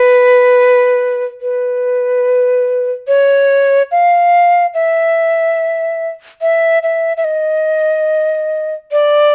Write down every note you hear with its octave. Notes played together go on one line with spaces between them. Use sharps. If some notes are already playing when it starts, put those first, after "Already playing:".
Already playing: B4
B4
C#5
F5
E5
E5
E5
E5
D#5
D5